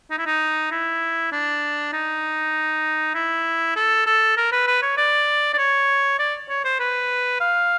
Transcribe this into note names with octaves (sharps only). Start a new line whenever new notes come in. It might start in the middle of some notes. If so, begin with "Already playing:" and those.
D#4
E4
D#4
E4
D4
D#4
E4
A4
A4
A#4
B4
B4
C#5
D5
D5
C#5
D5
C#5
C5
B4
F5